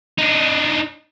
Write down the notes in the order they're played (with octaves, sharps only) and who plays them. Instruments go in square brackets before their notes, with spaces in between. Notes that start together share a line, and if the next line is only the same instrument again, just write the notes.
[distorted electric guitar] D4 D#4